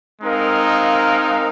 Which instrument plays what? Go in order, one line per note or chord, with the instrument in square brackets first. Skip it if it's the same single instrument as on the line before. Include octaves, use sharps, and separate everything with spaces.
[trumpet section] G#3 C4 D#4 A#4 F5